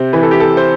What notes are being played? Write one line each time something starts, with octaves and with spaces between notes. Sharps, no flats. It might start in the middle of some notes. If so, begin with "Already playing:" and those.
Already playing: C3 C5
E3 B4
A4
G4
A4
C5